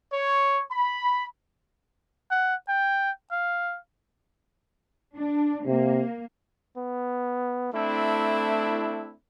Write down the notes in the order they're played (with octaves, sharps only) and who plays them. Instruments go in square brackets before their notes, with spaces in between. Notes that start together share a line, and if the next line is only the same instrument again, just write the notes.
[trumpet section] C#5
B5
[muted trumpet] F#5
G5
F5
[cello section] D4
[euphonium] C3 [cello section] A#3
[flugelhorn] B3
[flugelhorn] A3 [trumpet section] C4 D4 E4